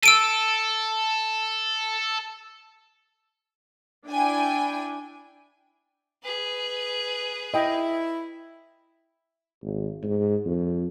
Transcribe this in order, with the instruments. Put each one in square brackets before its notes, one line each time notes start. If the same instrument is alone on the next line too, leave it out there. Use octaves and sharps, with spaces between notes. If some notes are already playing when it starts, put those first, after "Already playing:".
[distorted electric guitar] A4 [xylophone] E6 D7 D#7
[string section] D4 E4 G5 G#5
[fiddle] G#4 B4
[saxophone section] E4 [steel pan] D#5 G5
[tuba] G#1
G#2
F2